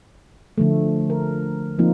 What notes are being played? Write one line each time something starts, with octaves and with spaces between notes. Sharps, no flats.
D3 F3 A3
A#4
F3 A#3 C4 D#4 F4